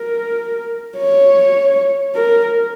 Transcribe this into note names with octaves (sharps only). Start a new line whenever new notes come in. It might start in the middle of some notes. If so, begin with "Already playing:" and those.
Already playing: A#4
C#5
A#4